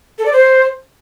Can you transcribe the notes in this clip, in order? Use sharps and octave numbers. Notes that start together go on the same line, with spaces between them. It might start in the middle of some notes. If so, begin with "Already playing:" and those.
A4
D5
C5